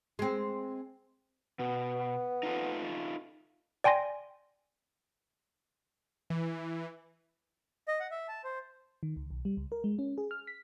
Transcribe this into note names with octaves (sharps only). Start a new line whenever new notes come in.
G#3 C4
B2 B3
D#4 F4 A4
D5 G5 G#5 C6 A#6
E3
D#5
F#5
E5
A5
C5
D#3
C#2
B1
G3
C#2
A#4
G#3
C#4
G#4
F6
B6